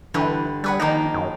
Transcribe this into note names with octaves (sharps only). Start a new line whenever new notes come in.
G2 D3 E3 B4
G3 G#4 B4 F#5
D#3 F3 A#3 D#4
F#2